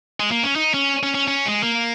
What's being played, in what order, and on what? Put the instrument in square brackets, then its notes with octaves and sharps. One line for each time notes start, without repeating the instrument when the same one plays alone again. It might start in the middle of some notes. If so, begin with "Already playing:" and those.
[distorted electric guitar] G#3
A#3
C#4
D#4
C#4
C#4
C#4
C#4
G#3
A#3